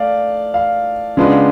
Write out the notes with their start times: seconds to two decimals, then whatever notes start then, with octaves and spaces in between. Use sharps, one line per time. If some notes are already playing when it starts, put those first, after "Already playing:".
Already playing: A3 D5 F5
0.54 F5
1.17 C#3 G#3 B3 D4 F4